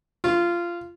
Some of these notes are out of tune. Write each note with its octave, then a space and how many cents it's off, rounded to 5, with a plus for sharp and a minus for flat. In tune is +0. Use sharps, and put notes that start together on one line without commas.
F4 -15